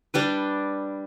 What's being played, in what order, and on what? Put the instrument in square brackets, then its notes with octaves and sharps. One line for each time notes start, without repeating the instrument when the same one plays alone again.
[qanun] G3 D4 B4